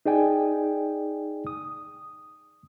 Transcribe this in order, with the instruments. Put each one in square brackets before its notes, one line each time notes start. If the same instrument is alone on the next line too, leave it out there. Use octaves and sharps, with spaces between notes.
[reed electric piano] D#4 G#4 D5 G5 G#5
D#6